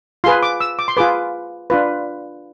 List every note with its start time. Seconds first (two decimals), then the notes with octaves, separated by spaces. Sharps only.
0.24 F4 G#4 B4 C6
0.43 D6
0.60 E6
0.79 D6
0.88 C6
0.97 F4 G#4 B4 D6
1.70 D4 F4 B4